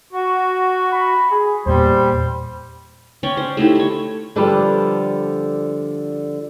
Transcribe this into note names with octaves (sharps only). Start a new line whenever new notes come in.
F#4
B5
G#4
E2 A#2 G3 C5
C#4 C#5 D5 G5
C5
A3 D#4 E4 G4
A3 C#5
D3 F3 G3 A4 B4